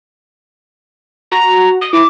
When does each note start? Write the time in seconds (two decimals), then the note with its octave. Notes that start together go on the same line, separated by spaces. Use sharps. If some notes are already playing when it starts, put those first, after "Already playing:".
1.32 F#4 A#5
1.81 D#6
1.93 E4 D6